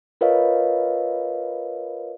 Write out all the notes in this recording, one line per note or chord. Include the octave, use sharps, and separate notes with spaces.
F4 A#4 B4 C#5 D#5 F5